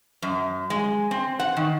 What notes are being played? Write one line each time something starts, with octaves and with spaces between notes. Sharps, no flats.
F#2
G#3
C4
F#5
D#3